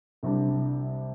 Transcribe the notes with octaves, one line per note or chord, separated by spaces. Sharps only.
C2 C3 G3 D4